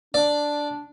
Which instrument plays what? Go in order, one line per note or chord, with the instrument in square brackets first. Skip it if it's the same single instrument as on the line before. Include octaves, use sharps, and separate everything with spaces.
[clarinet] D4 [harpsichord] D5